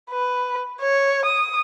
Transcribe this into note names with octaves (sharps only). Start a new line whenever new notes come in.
B4
C#5
D#6